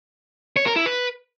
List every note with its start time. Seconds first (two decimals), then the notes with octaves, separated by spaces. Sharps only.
0.57 C#5
0.66 A#4
0.76 E4
0.86 B4